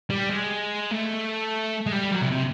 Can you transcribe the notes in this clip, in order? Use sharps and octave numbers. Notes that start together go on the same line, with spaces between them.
G3
G#3
A3
G#3
G3
F#3
C3
C3